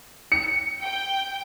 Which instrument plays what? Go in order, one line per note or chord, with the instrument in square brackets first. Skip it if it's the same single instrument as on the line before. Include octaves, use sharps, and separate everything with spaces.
[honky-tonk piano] C#7
[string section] G5